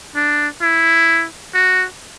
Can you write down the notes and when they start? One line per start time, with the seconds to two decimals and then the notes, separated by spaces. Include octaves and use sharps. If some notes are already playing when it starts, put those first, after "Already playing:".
0.16 D4
0.62 E4
1.54 F#4